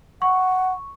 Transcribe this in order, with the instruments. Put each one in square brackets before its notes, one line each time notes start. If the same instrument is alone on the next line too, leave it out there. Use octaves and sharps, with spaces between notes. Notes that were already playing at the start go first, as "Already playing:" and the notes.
[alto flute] F#5 [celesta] C#6